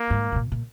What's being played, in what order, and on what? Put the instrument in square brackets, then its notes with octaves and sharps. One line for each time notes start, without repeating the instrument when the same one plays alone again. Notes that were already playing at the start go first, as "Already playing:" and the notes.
Already playing: [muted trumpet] A#3
[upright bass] G#2
A2
A#2
A#2